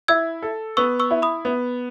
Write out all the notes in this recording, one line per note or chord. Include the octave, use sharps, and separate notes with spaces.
E4 E6 G#6
A4
B3 C#6 E6
C#6 E6
E4
B5 D#6
B3